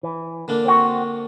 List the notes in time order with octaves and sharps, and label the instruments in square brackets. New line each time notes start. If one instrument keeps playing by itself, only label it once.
[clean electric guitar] E3
[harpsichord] D3 A#3 D4
[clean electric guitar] C4 F#4